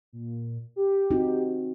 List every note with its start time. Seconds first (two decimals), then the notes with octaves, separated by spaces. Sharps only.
0.13 A#2
0.76 G4
1.11 C4 D#4 F#4